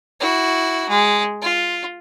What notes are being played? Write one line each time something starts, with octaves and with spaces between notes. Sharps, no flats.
E4 F#4
G#3
F4